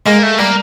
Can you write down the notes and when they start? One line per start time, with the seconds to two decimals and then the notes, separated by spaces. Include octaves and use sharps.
0.06 G#3 A#3
0.23 A3
0.38 G3 A#3